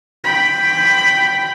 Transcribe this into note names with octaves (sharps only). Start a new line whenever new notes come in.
G5 B5